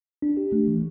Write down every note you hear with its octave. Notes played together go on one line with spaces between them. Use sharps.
D4
G4
A3
E3